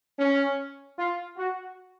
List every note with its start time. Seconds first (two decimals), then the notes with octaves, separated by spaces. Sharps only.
0.18 C#4
0.97 F4
1.37 F#4